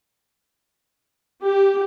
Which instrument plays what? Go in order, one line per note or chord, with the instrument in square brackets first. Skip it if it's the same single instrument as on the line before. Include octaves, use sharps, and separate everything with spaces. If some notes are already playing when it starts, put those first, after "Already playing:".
[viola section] G4